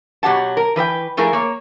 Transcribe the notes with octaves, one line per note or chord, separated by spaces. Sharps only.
B2 F#3 G4 F#5 A5
A#4
E3 B4 D#5 G5
F3 A3 E4 G#4 A#4
A#3 C#5